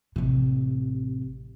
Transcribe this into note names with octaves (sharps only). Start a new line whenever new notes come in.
A1 C3